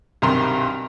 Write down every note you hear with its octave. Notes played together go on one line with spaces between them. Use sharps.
B1 G2 C3 D#3 A#5 C6